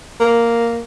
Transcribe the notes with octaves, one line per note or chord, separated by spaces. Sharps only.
A#3